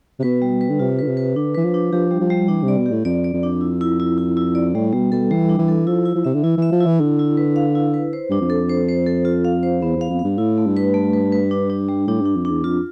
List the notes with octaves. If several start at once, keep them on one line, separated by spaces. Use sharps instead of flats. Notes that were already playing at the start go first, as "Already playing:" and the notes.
C3
B2 B4
G3
B4
D3
C3 F4
D3 B4
C3
B4
D3 D4
E3 B4
F3
D4
F3 G4
G3
F3
G3
E3 D4
C3
D5
B2
G4
A2
F2 D5
D5
F2
D4
E4
E4
E4
E4
E4
D5
A2 G3
B2 G3
B2 A4
E3 G3
D4
E3
A4
F3 E4
E4
F3
C3 E5
D3
E3 E4
E3 E5
F3
E4
E3
D3 E4
E4
B4
F5
E4
B4
C5
G2 D4
F2
A4
C5
C5
A4
F4
F5
C5
E2 B3
E2 F5
F2
G2 F5
A2 E4
A3
G2
B4
A3
B4
B4
D4
D4
G3
A2 D4
G2 D4
F2
D4
E2
F2 F4